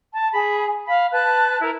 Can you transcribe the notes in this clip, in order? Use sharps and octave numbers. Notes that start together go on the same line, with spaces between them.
A5
G#4 B5
F5 B5
B4 A5 F#6
E4 A#4